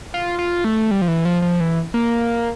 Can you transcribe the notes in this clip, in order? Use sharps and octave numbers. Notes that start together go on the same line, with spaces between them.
F4
F4
A3
G3
F3
E3
F3
F3
E3
A#3